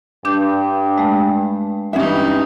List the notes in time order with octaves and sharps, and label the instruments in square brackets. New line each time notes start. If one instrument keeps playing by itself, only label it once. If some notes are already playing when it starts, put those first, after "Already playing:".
[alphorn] G2 [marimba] D4 D6 G6
[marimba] G#3 A3
[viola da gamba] G2 D#4 [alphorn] E3 [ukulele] C#4 E5